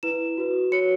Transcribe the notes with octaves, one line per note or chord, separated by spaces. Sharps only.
E4 B4 E7
F#4 B4
F#4 C#5 C#7